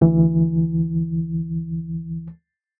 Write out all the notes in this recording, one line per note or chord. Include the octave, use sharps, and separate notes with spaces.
D2 E3